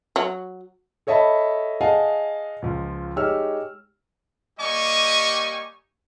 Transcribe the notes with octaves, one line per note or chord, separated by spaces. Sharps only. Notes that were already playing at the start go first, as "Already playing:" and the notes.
F#3
A4 C#5 D#5 E5 A5 B5
G#4 D#5 F5 F#5 G#5 A5
C#2 F3
G#3 D#4 G4 C#5 E6 F6
G3 A#3 G4 D#5 G#5 C#6